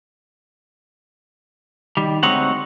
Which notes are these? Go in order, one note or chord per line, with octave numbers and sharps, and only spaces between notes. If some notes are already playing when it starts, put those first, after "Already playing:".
D#3 G3
D2 G#3 C4 D#4 C#5 F#5